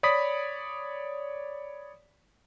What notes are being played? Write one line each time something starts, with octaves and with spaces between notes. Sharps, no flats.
C#5 D5 B5 D#6 B6